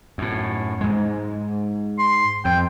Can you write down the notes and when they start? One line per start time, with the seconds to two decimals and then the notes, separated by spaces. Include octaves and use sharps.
0.18 F#2 A2
0.81 G#2 G#3
1.99 C6
2.45 F2 G5